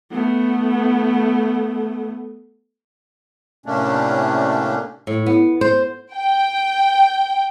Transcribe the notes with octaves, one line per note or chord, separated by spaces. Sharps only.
A3 B3
A2 C3 A3 A#3 C#4 D4
A2
B3
C5
G5